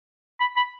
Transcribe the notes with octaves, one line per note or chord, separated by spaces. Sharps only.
B5
B5